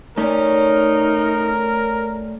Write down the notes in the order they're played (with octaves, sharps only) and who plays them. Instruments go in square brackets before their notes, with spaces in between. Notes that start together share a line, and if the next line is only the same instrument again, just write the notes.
[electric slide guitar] A3 D5 [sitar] C#4 [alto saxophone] D#4 [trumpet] A#4